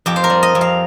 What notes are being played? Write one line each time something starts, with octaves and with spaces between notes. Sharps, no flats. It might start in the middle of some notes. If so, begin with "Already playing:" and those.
F2 G4
C5
A#4
G3
D#5
F2
F5